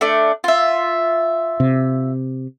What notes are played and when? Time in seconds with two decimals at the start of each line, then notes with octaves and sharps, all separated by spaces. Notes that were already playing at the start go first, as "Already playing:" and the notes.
0.01 A3 D4 D5
0.44 F4 E5
1.60 C3